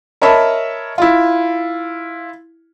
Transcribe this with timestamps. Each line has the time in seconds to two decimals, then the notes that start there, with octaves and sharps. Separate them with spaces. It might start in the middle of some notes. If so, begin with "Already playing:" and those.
0.22 A#4 C#5 D#5 E5 A5 B5
0.98 E4 F4